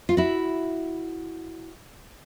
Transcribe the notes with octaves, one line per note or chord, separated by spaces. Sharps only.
F4
E4 F#4